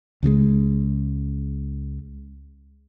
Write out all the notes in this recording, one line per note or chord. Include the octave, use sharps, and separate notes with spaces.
C#2 C#3 F3 G#3